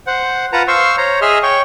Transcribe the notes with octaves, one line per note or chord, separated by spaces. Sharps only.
C5 F#5
F4 B4 F#5 A5 A#5
C5 F5 C6 C#6 E6
C5 C#5 A#5
G#4 D#5 E5 C6 F6
C#5 G5 C#6